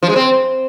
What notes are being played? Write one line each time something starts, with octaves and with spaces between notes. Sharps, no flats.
F3
G#3
C4